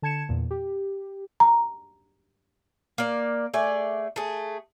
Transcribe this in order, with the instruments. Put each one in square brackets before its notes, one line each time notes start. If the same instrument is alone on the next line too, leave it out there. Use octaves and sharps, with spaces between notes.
[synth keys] D3 A5 G#6 C#7 E7
E2 A#2
G4
[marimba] A#5
[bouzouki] A#3 D5
A3 G#4 D5
A3 G#4